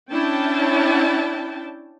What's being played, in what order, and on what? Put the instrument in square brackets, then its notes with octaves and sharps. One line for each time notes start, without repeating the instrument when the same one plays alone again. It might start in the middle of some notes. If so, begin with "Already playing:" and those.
[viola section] C#4 D4 E4 G5 A5